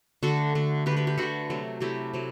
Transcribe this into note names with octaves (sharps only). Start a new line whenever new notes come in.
D3 A3 F#4 A4
D3 A3
D3 G4 B4
A3
G4 B4
G4 B4
D3 A3 F#4 A4
C3 F#3 A3
C3 F#3 A3 E4 G4
C3 F#3